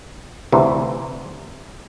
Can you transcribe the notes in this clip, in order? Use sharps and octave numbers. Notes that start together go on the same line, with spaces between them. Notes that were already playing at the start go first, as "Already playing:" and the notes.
D2 C3 E3